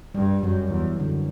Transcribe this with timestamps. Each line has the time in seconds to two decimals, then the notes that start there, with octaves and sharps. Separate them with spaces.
0.14 G2 G3
0.43 F#2 F#3
0.71 E2 E3
0.99 F#2 D3